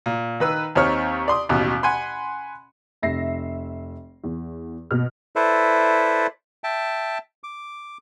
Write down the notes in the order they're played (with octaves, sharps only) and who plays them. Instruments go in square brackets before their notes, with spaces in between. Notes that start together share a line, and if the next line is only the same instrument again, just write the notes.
[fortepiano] A#2
D#3 B4 E6
D#2 C4 D#4 C#5 F6
D5 C6 D#6
A1 D#2 B2
F#5 G#5 B5 C6
[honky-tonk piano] F1 E5 A#6 C7
E2
B2 F6
[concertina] E4 A4 B4 C5 D5 E5
E5 G5 A5
D6